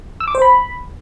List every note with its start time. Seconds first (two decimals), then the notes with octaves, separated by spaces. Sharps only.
0.20 E6
0.28 D6
0.35 C5
0.42 B5